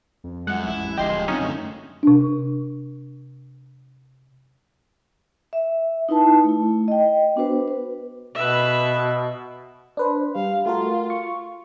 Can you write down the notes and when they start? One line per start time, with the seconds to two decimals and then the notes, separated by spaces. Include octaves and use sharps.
0.24 F2
0.47 F#2 G#3 F#5
0.67 A1 E4
0.98 D1 F3 G#3 G4 D#5 C6
1.28 F#3 G3 C4 C#4 D#4 F4
1.40 F#2 D3 A3
2.03 C3 D4
5.53 E5
6.09 D#4 E4 B4 A5
6.44 A3 E4
6.88 D#5 G5
7.36 B3 D4 F#4 B4 C5
7.68 B4
8.35 B2 B4 E5
9.97 D4 B4 C5
10.35 G3 F5
10.66 A3 F4 F#4 A#4
11.10 C#6